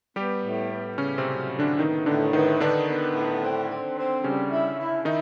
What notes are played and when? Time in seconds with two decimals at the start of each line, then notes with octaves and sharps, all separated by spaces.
0.16 G3 B3 G4
0.44 A2
0.71 B3
0.98 A2 C#3 C#4
1.18 C3 C4
1.26 F#3
1.52 A2
1.59 D3 D4
1.79 D#3 B3 D#4
2.06 A2 D3 D4
2.33 D#3 B3 D#4
2.60 D3 B3 D4
2.87 B3
3.15 A2
3.42 C4
3.70 C4
3.97 C4
4.24 C#3 G3 C#4
4.51 E4
4.78 E4
5.05 D#3 D#4 E4